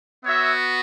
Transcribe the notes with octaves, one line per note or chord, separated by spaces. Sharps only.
B3 F#4 C#5 E5